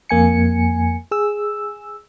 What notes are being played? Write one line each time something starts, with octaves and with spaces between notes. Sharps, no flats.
F2 A#3 G#5 C#7
G#4 E6